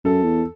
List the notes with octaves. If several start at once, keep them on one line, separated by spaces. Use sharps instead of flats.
F#2 A4
E2